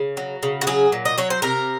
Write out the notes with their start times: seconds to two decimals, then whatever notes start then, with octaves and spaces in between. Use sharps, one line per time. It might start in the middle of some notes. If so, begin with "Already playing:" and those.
Already playing: C#3
0.17 F#3
0.43 C#3
0.61 F#4
0.67 F#3 G#4
0.92 A#2
1.05 D#5
1.18 F#3 C#5
1.30 C5
1.42 C3 A#4